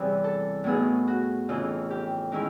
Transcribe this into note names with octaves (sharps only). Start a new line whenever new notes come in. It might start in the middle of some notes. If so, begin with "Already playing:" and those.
Already playing: E2 C3 E3 G3 C4
A4
A2 F#3 B3 D#4 G#4
F#4
F2 C#3 E3 F4
G4
D#3 G#3 C#4 E4